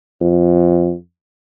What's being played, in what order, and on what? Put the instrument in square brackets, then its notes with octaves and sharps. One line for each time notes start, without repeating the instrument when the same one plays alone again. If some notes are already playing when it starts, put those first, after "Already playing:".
[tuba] F2